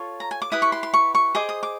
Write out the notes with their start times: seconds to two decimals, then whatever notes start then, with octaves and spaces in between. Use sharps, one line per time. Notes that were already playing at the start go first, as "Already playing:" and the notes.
Already playing: F4 A4 C#5
0.20 A#5
0.31 G#5
0.42 D6
0.52 E4 G4 B4 D#6
0.62 C#6
0.72 C6
0.83 C6
0.94 C#6
1.15 C#6
1.35 G#4 C5 D#5 D6
1.49 D#6
1.63 D6